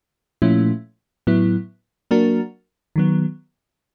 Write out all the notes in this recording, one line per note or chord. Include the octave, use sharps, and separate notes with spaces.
A#2 F3 A3 C#4 E4
A2 F#3 B3 E4
F#3 A#3 D4 F#4 A#4
D#3 F#3 B3